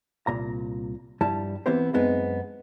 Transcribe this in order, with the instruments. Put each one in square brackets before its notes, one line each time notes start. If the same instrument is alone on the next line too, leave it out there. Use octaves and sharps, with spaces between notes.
[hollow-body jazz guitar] C2 A#2 A#5
G2 F3 G3 E4 A5
E3 B3 C4 E4 G4 C5
F#2 G#3 B3 C4 D#4